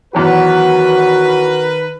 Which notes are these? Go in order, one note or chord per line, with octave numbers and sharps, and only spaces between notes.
E2 D#3 F#3 F#4 A#4 B4